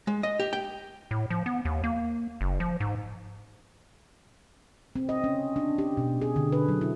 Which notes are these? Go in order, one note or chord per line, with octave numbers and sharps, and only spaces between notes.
G#3
D#5
G4
G5
A2
F3
B3
D#2
A#3
F#1
F3
G#2
C4
D#5
C#4
D4
G4
B2
G#4
D3
B4
F#3
E4